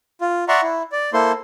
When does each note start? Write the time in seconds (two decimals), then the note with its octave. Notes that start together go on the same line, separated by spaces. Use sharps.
0.21 F4
0.48 D5 E5 F#5 A#5 C6 C#6
0.62 E4
0.92 D5
1.13 A#3 E4 A4 C5 C6